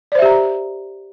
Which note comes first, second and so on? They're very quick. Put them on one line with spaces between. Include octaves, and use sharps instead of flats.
D5 C5 E5 G4 A#5